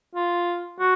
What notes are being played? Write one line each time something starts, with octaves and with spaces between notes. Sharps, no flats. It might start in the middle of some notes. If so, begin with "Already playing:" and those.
F4
F#4